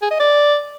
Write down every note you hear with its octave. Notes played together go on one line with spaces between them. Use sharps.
G#4
D#5
D5